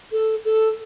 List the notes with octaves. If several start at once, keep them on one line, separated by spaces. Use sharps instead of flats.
A4
A4